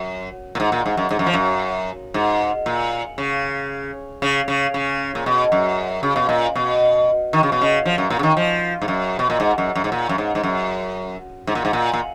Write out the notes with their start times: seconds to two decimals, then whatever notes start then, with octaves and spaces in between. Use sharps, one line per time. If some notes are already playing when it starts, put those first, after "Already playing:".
Already playing: F#2
0.55 A#2
0.60 G#2
0.72 A#2
0.86 G#2
0.97 F#2
1.11 G#2
1.19 F#2
1.26 F3
1.33 F#2
2.14 G#2
2.66 A#2
3.18 C#3
4.22 C#3
4.48 C#3
4.74 C#3
5.15 A#2
5.26 B2
5.52 F#2
6.03 C#3
6.16 B2
6.29 A#2
6.55 B2
7.33 D#3
7.43 C#3
7.52 B2
7.61 C#3
7.85 F3
7.98 F#2
8.10 A#2
8.19 C#3
8.23 D#3
8.37 F3
8.82 G#2
8.88 F#2
9.19 B2
9.30 A#2
9.40 G#2
9.58 F#2
9.75 F#2
9.84 G#2
9.92 A#2
10.09 F#2
10.18 G#2
10.35 G#2
10.43 F#2
11.47 G#2
11.55 A#2
11.65 G#2
11.73 A#2
11.93 A#2